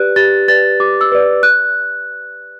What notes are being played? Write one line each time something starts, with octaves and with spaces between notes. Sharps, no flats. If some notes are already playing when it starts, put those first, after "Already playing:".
Already playing: G4 B4 D5 F#6
G4 A6
B4 D5 A6
G4 D6
E6
B4 D5
F#6